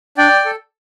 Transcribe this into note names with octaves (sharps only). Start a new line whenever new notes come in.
D4 D5 G5
A4